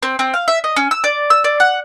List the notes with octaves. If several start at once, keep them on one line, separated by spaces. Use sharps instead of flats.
C4
C4
F5
E5
D#5
C#4
E6
D5
E6
D5
F#5